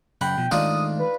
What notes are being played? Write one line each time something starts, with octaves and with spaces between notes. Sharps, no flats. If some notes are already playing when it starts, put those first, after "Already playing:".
F#2 C#3 F#5 G5 B5
B2 F3
D#3 G#3 A3 D4 D#4 F4 D#6
B4